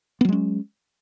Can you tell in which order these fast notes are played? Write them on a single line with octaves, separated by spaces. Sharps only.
B3 F#3 G#3 C#4